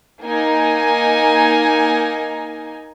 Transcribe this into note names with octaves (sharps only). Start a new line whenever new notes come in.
A#3 D#4 G#5